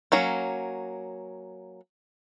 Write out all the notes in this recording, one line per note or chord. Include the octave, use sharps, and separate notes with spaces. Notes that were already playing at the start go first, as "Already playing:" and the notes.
F#3 A#3 C#4